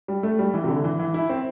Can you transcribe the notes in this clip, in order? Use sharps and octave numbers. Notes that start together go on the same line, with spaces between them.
G3
A3
G3
E3
C3
D3
E3
E3
E4
C4